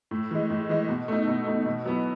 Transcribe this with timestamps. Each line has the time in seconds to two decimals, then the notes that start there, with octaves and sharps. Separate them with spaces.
0.11 A2
0.31 E3 G#3
0.50 A2
0.69 E3 G#3
0.89 B2
1.08 A3 D#4
1.28 B2
1.46 A3 D#4
1.66 B2
1.85 F#3 B3 E4